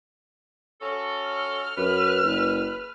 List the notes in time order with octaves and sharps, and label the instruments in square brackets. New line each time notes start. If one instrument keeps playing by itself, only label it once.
[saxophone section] C#4 F#4 A4
[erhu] F6
[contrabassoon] F#2 [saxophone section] B4
[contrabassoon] F#1